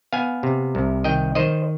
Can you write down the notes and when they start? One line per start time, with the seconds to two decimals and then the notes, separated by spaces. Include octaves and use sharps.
0.13 B3 F5 G#5
0.43 C3
0.75 C2
1.04 D#3 D#5 G5
1.35 D#3 C5 D#5